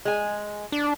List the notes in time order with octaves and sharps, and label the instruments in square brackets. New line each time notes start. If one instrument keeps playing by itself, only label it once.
[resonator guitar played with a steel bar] G#3 G#5
[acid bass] D4